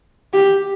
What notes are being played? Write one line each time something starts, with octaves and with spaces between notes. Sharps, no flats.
G4